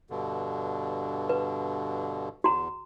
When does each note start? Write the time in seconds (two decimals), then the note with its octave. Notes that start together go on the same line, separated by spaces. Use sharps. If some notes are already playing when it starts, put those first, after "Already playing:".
0.10 G2 B2 D3
1.29 B4
2.44 E2 F#4 A#5